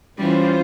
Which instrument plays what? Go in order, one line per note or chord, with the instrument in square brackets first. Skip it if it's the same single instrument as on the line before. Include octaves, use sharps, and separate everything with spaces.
[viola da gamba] E3 G3 [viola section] C#4 F4 C5